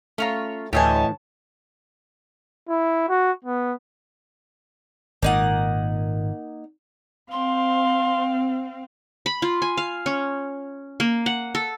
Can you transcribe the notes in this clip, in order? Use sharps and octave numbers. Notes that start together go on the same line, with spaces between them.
A3 C#4 F4 C#5 A#5
D2 A2 E3 G4 C#5 D#5 G#5 A5
E4
F#4
B3
G#1 A#2 A#3 D#4 F#5
C4 F5 C6
B5
F4
G#5
F5
C#4
A#3
F#5
A4